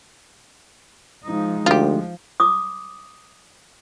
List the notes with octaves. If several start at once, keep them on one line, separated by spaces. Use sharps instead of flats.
F3 G#3 D#4
D2 F3 F4 G4
D6 D#6